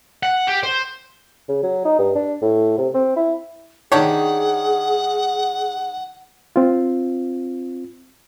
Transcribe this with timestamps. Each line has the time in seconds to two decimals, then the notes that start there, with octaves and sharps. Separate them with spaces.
0.23 F#5
0.47 G4
0.63 C5
1.49 C#3
1.63 F#3
1.85 D#4
1.99 G2
2.15 D4
2.42 A2
2.78 C3
2.94 C4
3.16 E4
3.92 D#3 D4 G4 G#4 C#5 F#5
6.56 C4 F4